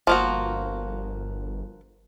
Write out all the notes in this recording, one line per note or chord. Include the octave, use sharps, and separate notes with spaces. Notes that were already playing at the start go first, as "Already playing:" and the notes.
G1 F3 A#3 F#4